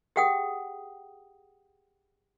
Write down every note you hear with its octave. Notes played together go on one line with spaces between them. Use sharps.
G4 G#4 F#5 G5 D#6